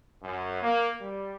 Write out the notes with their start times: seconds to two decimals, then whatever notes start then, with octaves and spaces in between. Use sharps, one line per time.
0.23 F#2
0.62 A#3
1.02 G3